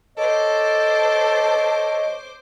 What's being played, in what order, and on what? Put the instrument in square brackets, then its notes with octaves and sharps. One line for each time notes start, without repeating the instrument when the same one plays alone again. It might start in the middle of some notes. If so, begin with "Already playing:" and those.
[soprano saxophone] A4 [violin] C5 D6 [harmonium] C#5 D#5